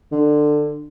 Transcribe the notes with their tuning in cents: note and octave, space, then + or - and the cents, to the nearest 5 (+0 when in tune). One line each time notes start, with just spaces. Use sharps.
D3 +20